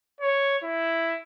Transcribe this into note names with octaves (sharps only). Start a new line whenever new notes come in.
C#5
E4